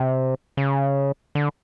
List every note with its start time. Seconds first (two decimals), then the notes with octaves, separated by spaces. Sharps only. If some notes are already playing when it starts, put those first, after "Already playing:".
Already playing: C3
0.57 C#3
1.35 D3